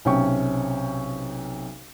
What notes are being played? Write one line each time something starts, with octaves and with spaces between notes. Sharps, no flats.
B1 C3 C#4 G5 C#6